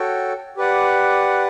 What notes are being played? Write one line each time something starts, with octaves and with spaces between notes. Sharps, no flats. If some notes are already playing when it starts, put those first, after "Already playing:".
Already playing: F#4 A4 C#5 G5
G4 B4 D5 F#5